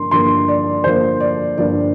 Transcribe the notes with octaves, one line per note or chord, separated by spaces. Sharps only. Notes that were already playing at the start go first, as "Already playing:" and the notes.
Already playing: G2 D3 F3 A#3 C6
G2 D3 F3 A#3 C6
D5
G2 D3 F3 A#3 C5
D5
G2 D3 F3 A#3 D5